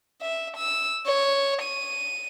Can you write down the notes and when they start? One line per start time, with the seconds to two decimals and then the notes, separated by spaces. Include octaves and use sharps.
0.21 E5
0.56 E6
1.06 C#5
1.62 D#7